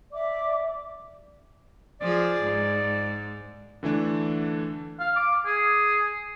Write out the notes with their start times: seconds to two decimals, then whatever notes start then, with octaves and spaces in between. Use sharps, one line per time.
0.12 D5 E5 D6
2.01 F3 G#4 D5
2.43 G#2
3.83 D3 E3 A3 D4
5.00 F5
5.16 D6
5.46 G#4